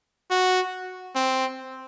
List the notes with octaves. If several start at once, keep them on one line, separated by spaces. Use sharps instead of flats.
F#4
C4